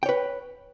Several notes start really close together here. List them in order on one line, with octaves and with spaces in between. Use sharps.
G5 C#5 B4